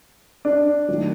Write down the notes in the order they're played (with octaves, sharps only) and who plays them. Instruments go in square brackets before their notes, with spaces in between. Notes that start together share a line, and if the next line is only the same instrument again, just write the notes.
[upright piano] D4
[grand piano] D#3 F#3 A3